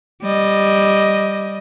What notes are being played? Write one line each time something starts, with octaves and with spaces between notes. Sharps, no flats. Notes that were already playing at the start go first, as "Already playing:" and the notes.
G3 D#5